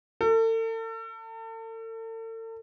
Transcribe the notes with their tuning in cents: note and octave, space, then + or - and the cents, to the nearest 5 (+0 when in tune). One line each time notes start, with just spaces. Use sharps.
A4 +40